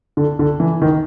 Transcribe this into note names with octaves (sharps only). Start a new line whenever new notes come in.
D3
D3
E3
D#3